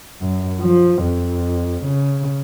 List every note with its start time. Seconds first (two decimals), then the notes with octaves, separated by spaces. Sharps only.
0.21 F#2
0.62 F3
1.03 F2
1.85 C#3